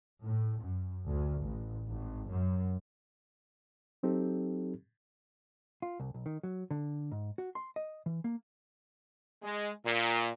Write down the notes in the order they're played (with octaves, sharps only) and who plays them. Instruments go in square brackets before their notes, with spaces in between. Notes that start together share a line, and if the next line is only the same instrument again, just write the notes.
[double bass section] A2
F#2
D2
A1
G#1
F#2
[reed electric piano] F#3 C4 D#4 G4 A4
[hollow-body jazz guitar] F4
C2
B1
D#3
F#3
D3
G#2
F#4
C6
D#5
E3
A#3
[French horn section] G#3
A#2